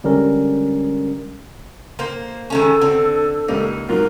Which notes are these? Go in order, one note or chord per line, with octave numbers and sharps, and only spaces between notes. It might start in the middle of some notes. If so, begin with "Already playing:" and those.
D3 G3 G#3 C#4 A#4
A#3 C5
D#3 G#3 C#4 A4
D3 C4
C#2 G3 A#3 D#4
G#2 F#3 F4 A#4